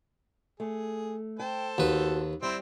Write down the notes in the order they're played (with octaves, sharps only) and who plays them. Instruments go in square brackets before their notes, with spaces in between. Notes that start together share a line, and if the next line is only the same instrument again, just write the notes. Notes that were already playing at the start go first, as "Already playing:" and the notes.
[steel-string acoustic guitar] A3 [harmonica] G#4
[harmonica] A4 C5 A5 [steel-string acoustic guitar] G5
[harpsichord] D#2 B4 [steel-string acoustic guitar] F#4
[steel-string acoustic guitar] G3 [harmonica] C4 E4